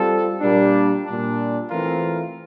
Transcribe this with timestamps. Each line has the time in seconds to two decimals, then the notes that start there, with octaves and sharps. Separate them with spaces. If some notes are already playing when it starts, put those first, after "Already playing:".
Already playing: G3 C4 F4 A4
0.40 A#2 G3 A#3 D4
1.06 A#2 G3 D4
1.70 E3 A3 C4 F4 A#4